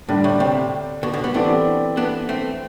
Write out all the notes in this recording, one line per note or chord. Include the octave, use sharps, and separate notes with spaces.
A2 D3 G3 D4
A2
A2 C3
B2 D3
B2 D3
G3 B3
E3 A3 B3 C4 D4 G4 D5
B3 D4
A3 C4